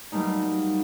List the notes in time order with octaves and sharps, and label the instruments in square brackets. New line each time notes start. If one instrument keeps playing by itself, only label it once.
[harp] F#3 G3 A3 A#3 D#4